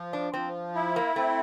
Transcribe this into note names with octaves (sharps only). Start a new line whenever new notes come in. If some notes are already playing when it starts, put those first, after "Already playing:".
Already playing: F3
D4
F3 C4
E4
A#3
A3 C4